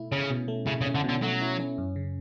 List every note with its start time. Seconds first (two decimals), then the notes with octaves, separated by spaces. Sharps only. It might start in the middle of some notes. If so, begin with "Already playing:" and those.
Already playing: B2 A3 E4
0.12 C#3 C#4
0.30 B2
0.48 A3
0.66 C#3 E4
0.81 C#3
0.86 C#4
0.95 D3
1.04 B2
1.09 D3
1.22 F#3 A3
1.41 E4
1.60 C#4
1.78 F#2
1.96 C#3